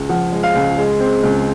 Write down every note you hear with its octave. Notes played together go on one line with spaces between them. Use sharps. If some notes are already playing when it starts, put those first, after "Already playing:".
Already playing: C#2
F3 F#5
G#3
F5
C#2
G#3
C4
C#2